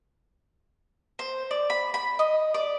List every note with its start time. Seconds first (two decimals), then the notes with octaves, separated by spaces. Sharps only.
1.19 C5
1.51 D5
1.70 B5
1.94 B5
2.19 D#5
2.54 D5